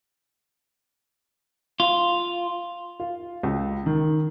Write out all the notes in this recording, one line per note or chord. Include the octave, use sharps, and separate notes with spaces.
F4
F4
C#2
D#3